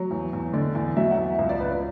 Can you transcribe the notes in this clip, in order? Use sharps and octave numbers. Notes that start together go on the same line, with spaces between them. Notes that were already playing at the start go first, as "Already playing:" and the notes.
Already playing: F#3
E2
E2
D3 D5
E2
F#3 E5
F#5
E2
E5
C#2
D5
C#2 B4
C#4